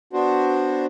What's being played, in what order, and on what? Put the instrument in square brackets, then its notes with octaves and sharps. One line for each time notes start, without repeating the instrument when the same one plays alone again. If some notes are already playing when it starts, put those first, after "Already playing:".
[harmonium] B3 D4 F#4 C5